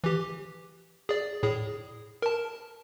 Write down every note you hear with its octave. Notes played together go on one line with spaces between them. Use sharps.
E3 G4
G#4 D5
A2 G#4
A#4 A5